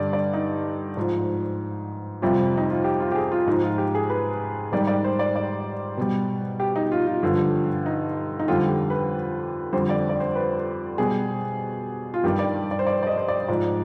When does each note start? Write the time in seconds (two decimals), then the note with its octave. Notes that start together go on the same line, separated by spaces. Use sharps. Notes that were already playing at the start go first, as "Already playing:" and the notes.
Already playing: G2 D3 G3 D5
0.13 D5
0.33 D#4
0.97 G#2 F3
2.22 F2 C3 G3 F4
2.57 D#4
2.70 F4
2.84 G4
3.00 F4
3.12 G4
3.15 G#4
3.32 F4
3.47 G#2 F3 D#4
3.63 F4
3.78 G4
3.95 G#4
4.10 B4
4.72 G#2 D#3 G3 D5
4.87 D5
5.04 C5
5.19 D5
5.36 D5
5.97 B2 G3
6.60 G4
6.76 D#4
6.92 F4
7.07 F4
7.23 G2 D3 F3
7.86 D#4
8.40 D#4
8.48 F2 D3 G3 F4
8.69 G4
8.90 B4
9.73 F2 D3 G3 C5
9.89 D5
10.09 D5
10.20 C5
10.35 B4
10.98 B2 G3 G#4
12.14 F4
12.24 G2 D#3 G3 G4
12.39 D5
12.71 D5
12.79 C5
12.87 D5
13.03 D5
13.07 D#5
13.17 C5
13.28 D5
13.48 G#2 F3 D5